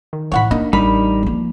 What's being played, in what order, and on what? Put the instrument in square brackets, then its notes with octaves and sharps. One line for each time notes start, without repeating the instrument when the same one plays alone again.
[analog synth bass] D#3
[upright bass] A2 E3 [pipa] C#5 F#5 B5
[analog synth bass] A#3 [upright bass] D4 [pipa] D#4
[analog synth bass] A1 [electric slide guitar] G3 D#4 A#4 [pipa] B5
[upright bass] F3 A#3